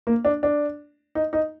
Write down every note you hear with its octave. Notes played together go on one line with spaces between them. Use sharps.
A#3
D4
D4
D#4
D#4